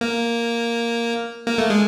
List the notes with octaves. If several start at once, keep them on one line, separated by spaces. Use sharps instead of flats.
A#3
A#3
A3
G#3